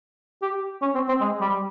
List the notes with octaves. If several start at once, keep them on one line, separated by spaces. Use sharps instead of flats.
G4
C#4
C4
C4
G#3
G3